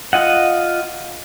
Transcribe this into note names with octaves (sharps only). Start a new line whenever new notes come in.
F4 D#5 F#5